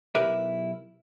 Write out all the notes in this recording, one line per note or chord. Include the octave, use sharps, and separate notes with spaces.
B1 E4 G4 A#4 B4 E5